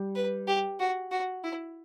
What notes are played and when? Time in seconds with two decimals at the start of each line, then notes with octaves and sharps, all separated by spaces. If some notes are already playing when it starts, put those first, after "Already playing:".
Already playing: G3
0.15 B4
0.47 G4
0.80 F#4
1.11 F#4
1.44 E4